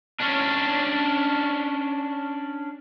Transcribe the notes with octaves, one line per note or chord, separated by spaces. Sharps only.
C#4 D4